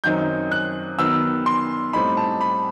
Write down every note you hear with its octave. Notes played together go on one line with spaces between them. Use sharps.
F#2 D#3 F#3 C4 D#4 G6
F#6
D#3 F#3 B3 E6
C6
A2 G3 C4 D#4 B5
A5
B5